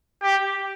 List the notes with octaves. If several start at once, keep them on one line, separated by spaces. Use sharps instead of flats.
G4